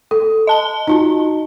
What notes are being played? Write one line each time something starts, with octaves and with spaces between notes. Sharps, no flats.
A4
D#5 A5 G7
D#4 F4 F#4